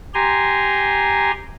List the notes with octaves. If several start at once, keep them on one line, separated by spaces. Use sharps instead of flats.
G4 G#5 A#5 C6